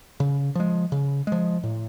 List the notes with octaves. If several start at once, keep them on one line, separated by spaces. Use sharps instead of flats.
C#3
F3 G#3
C#3
F3 G#3
A2